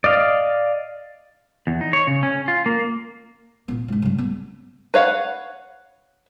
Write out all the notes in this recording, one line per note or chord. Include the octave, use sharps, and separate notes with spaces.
D5 D#5 F5
E2
D#4
C#5
C#3
C#4
F4
A#3
A#2 B3
D#1 G#2
C#3 G3
B3
B4 C#5 F5 F#5